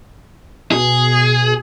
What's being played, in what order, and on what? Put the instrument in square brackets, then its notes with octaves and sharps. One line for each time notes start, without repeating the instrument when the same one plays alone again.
[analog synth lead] B2 [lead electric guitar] G#4